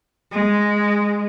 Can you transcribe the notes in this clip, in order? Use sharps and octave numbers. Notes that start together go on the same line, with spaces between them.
G#3